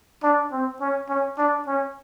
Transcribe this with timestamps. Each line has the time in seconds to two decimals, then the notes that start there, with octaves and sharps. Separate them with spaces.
0.23 D4
0.52 C4
0.81 C#4
1.09 C#4
1.38 D4
1.67 C#4